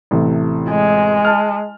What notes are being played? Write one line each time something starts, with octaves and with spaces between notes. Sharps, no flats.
A1 C3 A3
G#3
A5 F6